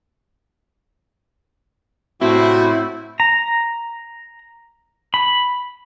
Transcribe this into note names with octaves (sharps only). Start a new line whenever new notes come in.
A2 C3 A3 C4 E4 F#4 C5
A#5
B5